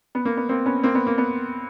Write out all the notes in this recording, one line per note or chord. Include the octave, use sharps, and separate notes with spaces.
B3
A#3
B3
A#3 C4
B3 C#4
A#3 C4
B3
A#3
B3